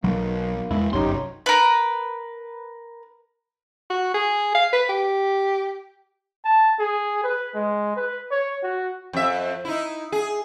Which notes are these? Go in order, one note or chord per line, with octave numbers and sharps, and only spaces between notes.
B1 F#3 A#3
E2 G#3 E4
G1 C2 F#2 D#4 G4 C#5 C6
A#4 B4
F#4
G#4
F5
B4
G4
A5
G#4
B4
G#3
B4
C#5
F#4
F2 E5
D#4 E4
G#4